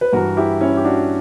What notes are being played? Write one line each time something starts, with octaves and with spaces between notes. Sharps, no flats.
B4
G2 E3 F#4 A#4
E4 G4
C#4 E4
G4
D4 F#4